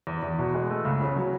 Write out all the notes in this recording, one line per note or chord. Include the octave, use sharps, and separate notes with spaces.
E2
E2
B2
G#3
A3
C#2
C#3
F#3